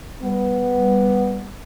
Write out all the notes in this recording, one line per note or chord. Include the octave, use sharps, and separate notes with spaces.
G3 B3